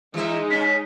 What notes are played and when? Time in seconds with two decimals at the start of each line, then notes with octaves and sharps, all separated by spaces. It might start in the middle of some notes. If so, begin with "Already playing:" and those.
0.14 E3 G#3 D#4 E5
0.50 C#3 C#4 B6